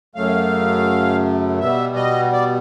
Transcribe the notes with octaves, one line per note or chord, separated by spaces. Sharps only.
F#2 C#3 F#3 A3 F5
B2 G3 B3 E5
D#5
D5